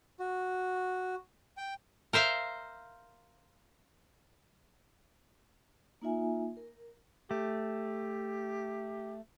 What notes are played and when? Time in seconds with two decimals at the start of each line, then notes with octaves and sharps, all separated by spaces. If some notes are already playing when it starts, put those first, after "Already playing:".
0.20 F#4
1.57 G5
2.13 A#4 C5 E5 F5
6.02 A#3 D#4 F4 E5 G#5
6.57 A#4
7.31 A3 G4